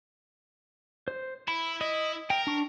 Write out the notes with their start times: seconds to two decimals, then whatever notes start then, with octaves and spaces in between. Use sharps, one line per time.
1.08 C5
1.48 E4 B5
1.81 E4 D#5
2.30 A#4 G5
2.47 D4 C#6